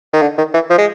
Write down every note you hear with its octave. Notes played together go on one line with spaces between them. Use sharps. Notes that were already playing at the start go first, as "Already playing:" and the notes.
D#3
D3
D#3
E3
F3
G#3